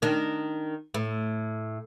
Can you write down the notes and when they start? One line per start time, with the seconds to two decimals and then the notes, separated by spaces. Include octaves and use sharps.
0.02 D#3 D4
0.94 A2